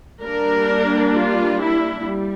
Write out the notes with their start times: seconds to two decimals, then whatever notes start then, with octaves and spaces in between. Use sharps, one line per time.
0.22 G3 A#3 D4 A#4
1.14 F4
1.60 E4
2.06 G3